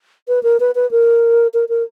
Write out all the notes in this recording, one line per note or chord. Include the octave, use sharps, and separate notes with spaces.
B4
A#4
B4
B4
A#4
A#4
A#4